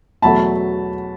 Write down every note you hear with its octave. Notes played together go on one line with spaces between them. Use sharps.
E2 B2 F#3 A3 A5 B5